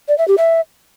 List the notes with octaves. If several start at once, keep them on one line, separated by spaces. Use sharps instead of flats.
D5
E5
G4
E5